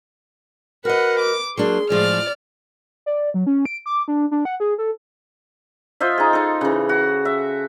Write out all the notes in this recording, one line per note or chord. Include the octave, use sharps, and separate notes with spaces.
F#4 A#4 B4 D#5 F#5
D6
F#3 A#3 D4 G#4 C6
A2 F3 G#3 D5 F6
D5
F#3
C#4
D7
D6
D4
D4
F#5
G#4
A4
F4 C5 D#5 E5
D#4 G#4
D#4 A4
C#3 E3
F#4
E5